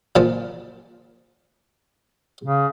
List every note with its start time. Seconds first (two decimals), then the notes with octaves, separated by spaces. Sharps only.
0.16 A#2 F3 A5
2.44 C#3